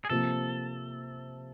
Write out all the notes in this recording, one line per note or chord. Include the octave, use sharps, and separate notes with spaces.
G#4
C3 F3 A#3 A4